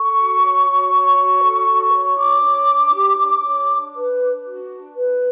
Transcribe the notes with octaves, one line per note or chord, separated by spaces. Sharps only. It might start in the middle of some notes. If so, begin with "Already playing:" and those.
Already playing: A4 C#6
F#4
C#5
F#4
C#5
F#4
A4
F#4
C#5
D4 D6
C#5
D4
G4
D4
C#5
D4
B4
D4
F#4
D4
B4